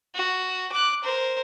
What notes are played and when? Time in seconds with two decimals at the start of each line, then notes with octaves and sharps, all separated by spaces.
0.15 F#4
0.72 D6 F#6
1.03 A#4 C5